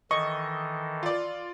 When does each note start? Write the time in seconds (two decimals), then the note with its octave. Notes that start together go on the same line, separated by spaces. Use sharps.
0.11 D#3 E3 A4 D#5 C#6
1.03 F4 D5